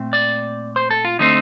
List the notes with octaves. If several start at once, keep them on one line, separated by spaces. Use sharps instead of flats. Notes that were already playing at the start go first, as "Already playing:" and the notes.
Already playing: A#2 A3 C4
D5
C5
A4
F4
D3 A3 C4 D#4